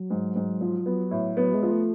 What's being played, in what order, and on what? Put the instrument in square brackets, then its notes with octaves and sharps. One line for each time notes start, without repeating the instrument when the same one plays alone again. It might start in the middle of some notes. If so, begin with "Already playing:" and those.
Already playing: [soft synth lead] F#3
[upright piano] G#2
G#2
F3
[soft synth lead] F#3 [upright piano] B3
[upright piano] A2
[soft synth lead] F#3 [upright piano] B3
[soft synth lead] G#3
[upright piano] F3
[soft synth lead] A3